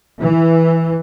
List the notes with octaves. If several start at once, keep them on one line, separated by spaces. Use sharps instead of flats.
E3